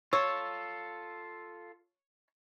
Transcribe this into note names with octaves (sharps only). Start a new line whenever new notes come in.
F4 A4 C#5 E6